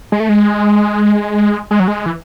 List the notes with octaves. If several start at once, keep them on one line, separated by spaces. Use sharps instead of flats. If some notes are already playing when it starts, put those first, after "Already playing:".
G#3
A3
G#3
G#3
F#3
G#3
E3